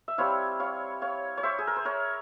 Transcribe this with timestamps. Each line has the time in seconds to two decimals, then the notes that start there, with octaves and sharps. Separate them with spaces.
0.08 E5
0.18 G3 C4 E4 C#5 F5
0.60 C#5 F5
1.02 C#5 F5
1.37 C#5
1.43 C5 E5
1.58 G#4
1.67 A#4
1.76 C5
1.85 A#4 C#5